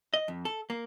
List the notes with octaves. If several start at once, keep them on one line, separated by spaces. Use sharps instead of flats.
D#5
F2
A4
A#3